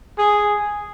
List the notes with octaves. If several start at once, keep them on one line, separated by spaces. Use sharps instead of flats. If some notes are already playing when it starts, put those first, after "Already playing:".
G#4